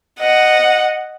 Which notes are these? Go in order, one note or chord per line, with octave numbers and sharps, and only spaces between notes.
D#5 F#5